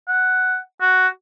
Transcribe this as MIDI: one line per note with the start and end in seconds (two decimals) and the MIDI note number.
0.08 0.58 78
0.81 1.07 66